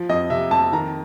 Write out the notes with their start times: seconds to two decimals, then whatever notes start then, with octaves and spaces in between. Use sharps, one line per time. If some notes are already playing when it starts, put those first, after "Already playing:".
Already playing: F3
0.09 F2 D#5
0.30 C3 E5
0.51 F2 A5
0.72 D#3 A#5